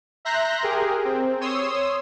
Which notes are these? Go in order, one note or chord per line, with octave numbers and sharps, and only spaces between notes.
E5 A#5 C6 F#6 G6 A#6
G4 G#4 A#4
C4
C#5 C6 D#6 E6